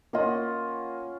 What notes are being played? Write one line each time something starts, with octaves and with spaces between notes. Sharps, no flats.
A#3 C#4 F4 D#5 F#5